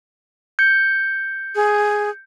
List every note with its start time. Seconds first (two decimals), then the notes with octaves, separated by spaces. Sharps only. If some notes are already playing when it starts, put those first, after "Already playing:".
0.59 G6 C#7
1.56 G#4